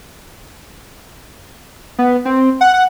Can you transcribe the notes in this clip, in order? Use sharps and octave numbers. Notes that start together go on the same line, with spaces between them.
B3
C4
F#5
F#5